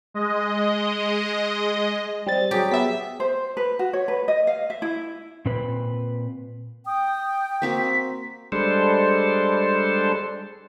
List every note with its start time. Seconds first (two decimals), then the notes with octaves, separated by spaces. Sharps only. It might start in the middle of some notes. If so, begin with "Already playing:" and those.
0.14 G#3 D#5
2.27 G3 C4 A6
2.51 F#3 G4 G#4
2.71 B3 E5 B6
3.20 C5
3.57 B4
3.79 F#4
3.93 C#5
4.08 B4
4.28 D#5
4.47 F5
4.70 E5
4.82 E4
5.45 A#2 C4 B4
6.86 G5 D#6
7.62 A#3 C4 F#4 B6
8.52 G3 G#3 D4 A4 C5